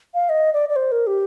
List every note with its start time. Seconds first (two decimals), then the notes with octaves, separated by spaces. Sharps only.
0.14 F5
0.29 D#5
0.54 D5
0.69 D5
0.76 C5
0.92 A#4
1.07 G4